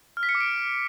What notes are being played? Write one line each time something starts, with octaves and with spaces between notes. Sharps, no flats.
F6
B6
C#7
D6
D7